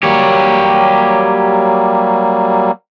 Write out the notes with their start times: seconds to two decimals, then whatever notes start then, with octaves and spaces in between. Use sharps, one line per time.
0.03 F#3 G3 A#3 G4 C#5